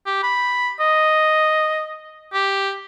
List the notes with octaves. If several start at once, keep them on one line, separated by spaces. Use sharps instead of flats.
G4
B5
D#5
G4